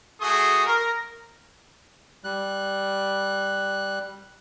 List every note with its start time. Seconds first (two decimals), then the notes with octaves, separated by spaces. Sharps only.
0.20 A3 F#4 G#4 C6 D#6
0.65 A#4
2.24 G3 F#6